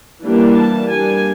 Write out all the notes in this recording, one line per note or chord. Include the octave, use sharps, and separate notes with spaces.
E3 G3 A#3 D4
A5
G3 A#3 D4 G#5